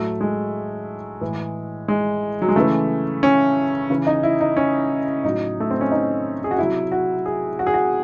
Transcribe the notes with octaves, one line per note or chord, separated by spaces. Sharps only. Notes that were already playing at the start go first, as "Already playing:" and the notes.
Already playing: A2 F#3 A3
G#3
A2 E3
G#3
F#3
G#3
C#3 E3 A3
C#4
C#3 E3
D#4
E4
D#4
C#4
A2 F#3 D#4
A3
C4
C#4
D#4
G#4
F#4
C3 F#3 E4
F#4
G#4
F#4
G#4
F#4